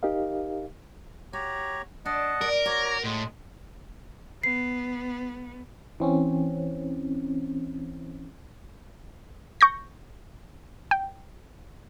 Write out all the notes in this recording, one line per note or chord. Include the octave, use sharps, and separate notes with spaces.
D#4 G4 A#4 D#5 F5
F#4 G4 C#5 A#5
D4 D#5 F#5 A5
A#4 D5
F#4 C#5 D5 A#5
A2 G#3
B3 C7
E3 C4 C#4
C#6 G6 A#6
G5